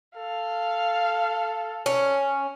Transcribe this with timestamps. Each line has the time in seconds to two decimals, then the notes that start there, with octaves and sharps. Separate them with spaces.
0.17 A4 F5
1.86 C#4